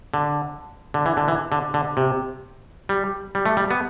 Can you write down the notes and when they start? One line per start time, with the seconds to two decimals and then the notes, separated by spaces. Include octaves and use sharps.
0.14 D3
0.94 D3
1.06 E3
1.17 D3
1.28 E3
1.52 D3
1.74 D3
1.97 C3
2.89 G3
3.35 G3
3.46 A3
3.57 G3
3.71 B3